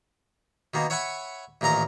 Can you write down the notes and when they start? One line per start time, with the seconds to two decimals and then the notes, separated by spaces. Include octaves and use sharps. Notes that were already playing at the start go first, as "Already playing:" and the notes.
0.74 B2 D#3 A#3
0.90 C#5 E5 F#5 G#5 B5
1.61 A1 A#2 D#3 A#4 A#5